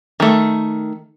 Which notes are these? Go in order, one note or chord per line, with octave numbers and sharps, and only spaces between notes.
D#3 A3